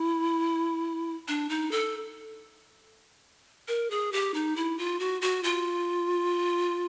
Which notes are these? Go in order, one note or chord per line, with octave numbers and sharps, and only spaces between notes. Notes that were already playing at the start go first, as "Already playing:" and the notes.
Already playing: E4
D4
D#4
A4
A#4
G#4
G4
D#4
E4
F4
F#4
F#4
F4